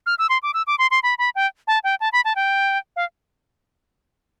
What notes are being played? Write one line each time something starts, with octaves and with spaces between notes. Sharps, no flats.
F6
E6
C6
D6
E6
D6
C6
C6
B5
B5
G5
A5
G5
A5
B5
A5
G5
F5